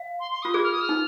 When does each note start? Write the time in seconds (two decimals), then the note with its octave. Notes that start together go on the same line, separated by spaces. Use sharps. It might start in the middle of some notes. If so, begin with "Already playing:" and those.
Already playing: F5
0.20 C6
0.31 C6
0.42 F4 D#6
0.54 G#4 G#6
0.63 F6
0.72 D#6
0.81 F6
0.89 D#4